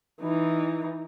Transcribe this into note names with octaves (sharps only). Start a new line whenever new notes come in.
E3 D#4